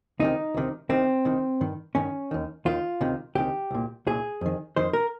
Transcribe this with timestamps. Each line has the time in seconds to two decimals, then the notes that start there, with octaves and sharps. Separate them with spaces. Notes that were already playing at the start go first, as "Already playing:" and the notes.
0.19 C#2 C3 D#3 D#4
0.54 C#2 C3 D#3
0.89 C2 C3 D#3 C4
1.25 C2 C3 D#3
1.61 G2 D#3
1.95 G2 D#3 C#4
2.31 D#2 D#3
2.65 D#2 D#3 F4
3.01 C#2 C3 D#3
3.35 C#2 C3 D#3 G4
3.71 C2 A#2
4.07 C2 A#2 G#4
4.41 F2 D#3
4.76 F2 D#3 C5
4.93 A#4